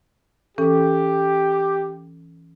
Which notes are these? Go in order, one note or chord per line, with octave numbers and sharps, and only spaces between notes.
E3 C#4 G4 A4
D6